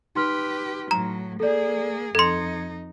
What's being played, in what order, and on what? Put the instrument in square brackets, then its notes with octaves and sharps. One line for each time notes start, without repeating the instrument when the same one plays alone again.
[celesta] D#4 C6 F6 [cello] G4 B4
[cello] A2 F#3 [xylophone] A#5
[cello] A#3 G#4 [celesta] A4 D5
[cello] F2 D#4 [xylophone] A4 C6 [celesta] G#6 C#7